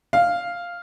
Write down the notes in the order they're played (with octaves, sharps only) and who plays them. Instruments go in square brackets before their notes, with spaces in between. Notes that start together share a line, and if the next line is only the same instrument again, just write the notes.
[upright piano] F5